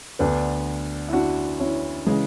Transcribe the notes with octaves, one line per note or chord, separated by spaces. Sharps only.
D2 D3 B3 D4
E4
D4 F#4
C#4 E4
C#3 E3 G#3